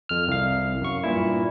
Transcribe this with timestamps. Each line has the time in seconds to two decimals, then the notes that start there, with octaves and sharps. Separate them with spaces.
0.09 F2 F6
0.28 C2 F5
0.81 F#2 C#6
1.04 G2 A#2 E4